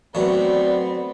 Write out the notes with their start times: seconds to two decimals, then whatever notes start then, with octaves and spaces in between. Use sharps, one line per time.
0.15 F#3 A3 B3 C4 D5